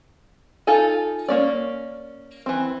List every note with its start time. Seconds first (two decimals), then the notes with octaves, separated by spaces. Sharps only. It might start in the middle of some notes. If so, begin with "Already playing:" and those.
0.67 D#4 F4 A4 G#5
1.28 A#3 C#4 D5
2.46 E3 C4